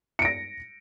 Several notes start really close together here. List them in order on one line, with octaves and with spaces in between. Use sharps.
C#7 D7 A#6